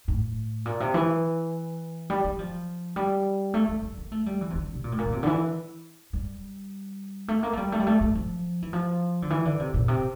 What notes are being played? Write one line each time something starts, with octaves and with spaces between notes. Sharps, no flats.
A2
A#2
C3
E3
G3
G3
F3
G3
A3
A3
G3
A#3
A3
G3
E3
C3
D3
C3
A#2
A2
A#2
D3
C3
D3
E3
G3
A3
A#3
A3
G3
A3
G3
A3
A3
F3
E3
F3
D3
E3
D3
C3
A#2
C3